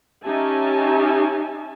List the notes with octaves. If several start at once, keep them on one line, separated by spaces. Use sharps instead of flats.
C#4 D#4 G4 E5 G#5 A5